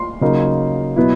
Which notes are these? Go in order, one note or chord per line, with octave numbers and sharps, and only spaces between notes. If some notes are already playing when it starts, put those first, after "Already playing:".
Already playing: C6
C#3 F#3 A#3 D#4
B2 F#3 B3 E4